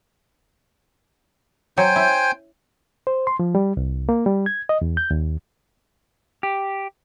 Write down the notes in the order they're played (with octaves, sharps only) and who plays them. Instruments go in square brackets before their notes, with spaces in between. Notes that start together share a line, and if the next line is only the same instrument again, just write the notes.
[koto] F#3 [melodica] C5 G5 G#5
[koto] E4
[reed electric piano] C5
C6
F3
G3
C2
A#3
G3
G#6
D#5
E2
G6
D#2
[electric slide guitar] G4